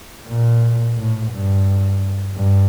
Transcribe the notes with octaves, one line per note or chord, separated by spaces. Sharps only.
A#2
A2
G2
G2